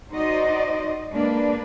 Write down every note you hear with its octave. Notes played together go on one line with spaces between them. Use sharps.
D#4 F#4 C5 D5 D#5
G#3 A#3 D4 B4